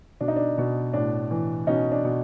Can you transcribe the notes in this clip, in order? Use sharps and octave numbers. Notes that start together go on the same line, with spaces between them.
B2 D4
D#4
D4
B2
A2 D4
E3
B2 C#4 D#4
D4
B2